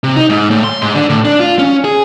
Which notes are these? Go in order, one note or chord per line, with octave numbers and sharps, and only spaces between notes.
C3
D#4
G#2
A2
C6
G#2
D3
A2
D4
F4
C#4
G#4